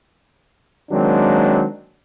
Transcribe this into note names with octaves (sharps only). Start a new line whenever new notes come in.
D#3 F#3 G#3 A#3 C4 D4